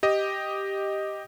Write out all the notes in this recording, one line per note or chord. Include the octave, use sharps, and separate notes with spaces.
G4 D#5